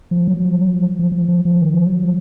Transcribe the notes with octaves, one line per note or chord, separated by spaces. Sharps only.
F3
F#3
F3
F#3
F3
F3
F3
F3
F3
D#3
F3
F#3
F3